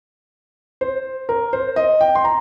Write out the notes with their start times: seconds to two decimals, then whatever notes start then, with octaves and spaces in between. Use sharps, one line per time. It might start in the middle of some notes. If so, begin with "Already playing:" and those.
0.81 C5
1.29 A#4
1.53 C5
1.76 D#5
2.01 G5
2.15 C6
2.25 A#5